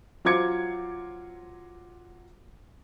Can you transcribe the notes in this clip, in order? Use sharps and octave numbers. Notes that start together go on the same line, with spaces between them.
F#3 F4 C5 D6 G#6 C#7